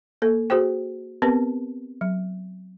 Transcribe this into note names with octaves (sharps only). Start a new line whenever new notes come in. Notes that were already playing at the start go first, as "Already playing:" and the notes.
A#3 A4
F#4 G#4 C5 G5
B3 C4 G4 A#4 B4
F#3